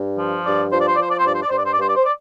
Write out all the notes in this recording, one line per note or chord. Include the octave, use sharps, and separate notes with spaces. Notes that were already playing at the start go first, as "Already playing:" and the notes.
Already playing: G2
F3
G2 D5
F3 C5
D5
C5
D5
F3 C5
D5
C5
G2 D5
C5
D5
G2 C5
D5
C5
D5
G2 C5
D5
C5
D5